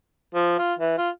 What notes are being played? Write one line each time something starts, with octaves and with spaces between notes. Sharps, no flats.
F3
F4
E3
F4